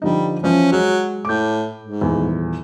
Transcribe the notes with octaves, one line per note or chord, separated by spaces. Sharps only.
D3 F3 G3 D#4
E3 F3 C#4 C#5
F#3 G#3
A2 D6 G6
G#2
D#1 E2